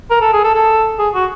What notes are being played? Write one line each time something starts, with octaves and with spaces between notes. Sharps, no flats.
A#4
A4
G#4
A4
A4
G#4
F#4